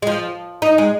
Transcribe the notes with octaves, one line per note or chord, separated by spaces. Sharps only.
G#3
F3
D#4
G#3